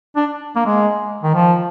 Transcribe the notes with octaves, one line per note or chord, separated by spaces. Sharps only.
D4
A#3
G#3
D#3
F3